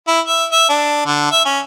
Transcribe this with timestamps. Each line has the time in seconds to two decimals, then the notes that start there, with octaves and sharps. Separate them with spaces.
0.07 E4
0.27 E5
0.52 E5
0.69 D4
1.06 D3
1.32 E5
1.45 C#4